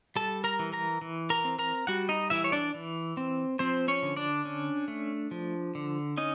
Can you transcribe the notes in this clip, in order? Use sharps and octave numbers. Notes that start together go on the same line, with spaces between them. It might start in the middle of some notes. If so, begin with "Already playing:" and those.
G3 A4 A5
A#4 A#5
E3
A#4 A#5
E3
A#4 A#5
C4
A#4 A#5
G3 F#4 F#5
D#4 D#5
E3 E4 E5
C#5
D4 D5
E3
C4
F3 C4 C5
C#4 C#5
D3
D4 D5
C#4
A3
F3
D3
C#4 D#4 D#5